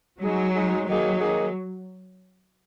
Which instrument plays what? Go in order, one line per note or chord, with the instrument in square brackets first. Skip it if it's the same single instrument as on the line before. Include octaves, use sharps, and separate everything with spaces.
[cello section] F#3 [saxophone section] G#3 D#4 G#4
[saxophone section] G#3 D#4 G#4
[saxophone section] D#3 A#3 D#4 G#4 [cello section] F#3
[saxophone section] D#3 A#3 D#4 G#4